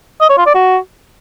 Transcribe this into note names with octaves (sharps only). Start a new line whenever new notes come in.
D#5
C#5
F4
D5
F#4